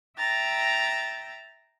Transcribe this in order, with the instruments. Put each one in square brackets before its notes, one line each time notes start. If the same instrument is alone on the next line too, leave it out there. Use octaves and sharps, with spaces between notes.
[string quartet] E5 G5 A#5 A6